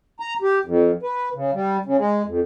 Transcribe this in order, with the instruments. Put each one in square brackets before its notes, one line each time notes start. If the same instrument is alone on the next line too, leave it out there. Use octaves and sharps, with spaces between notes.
[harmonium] A#5
G4
F2
B4
C#3
G3
C#3
G#3
F2